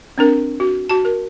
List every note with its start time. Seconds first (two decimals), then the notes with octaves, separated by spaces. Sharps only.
0.18 C4 D4 A#4
0.60 F#4
0.90 F#4 A5
1.05 A#4